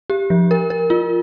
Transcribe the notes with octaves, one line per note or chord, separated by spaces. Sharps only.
G4
F3
A#4
A#4
F4